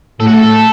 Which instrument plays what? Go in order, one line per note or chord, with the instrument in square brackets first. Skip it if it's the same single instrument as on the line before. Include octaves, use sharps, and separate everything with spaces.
[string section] A2 [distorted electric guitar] A4
[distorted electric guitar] F#4
A4